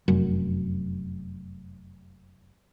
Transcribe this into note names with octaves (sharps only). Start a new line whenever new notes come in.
F1 F#2